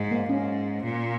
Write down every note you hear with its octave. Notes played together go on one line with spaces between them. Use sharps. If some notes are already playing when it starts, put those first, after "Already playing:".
Already playing: G#2
A#3
G#2 C#4
A#2